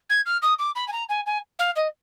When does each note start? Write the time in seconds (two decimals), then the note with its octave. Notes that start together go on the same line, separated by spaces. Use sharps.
0.09 G#6
0.26 F6
0.42 D#6
0.59 D6
0.75 B5
0.88 G#5
0.92 A#5
1.09 G#5
1.26 G#5
1.59 F5
1.76 D#5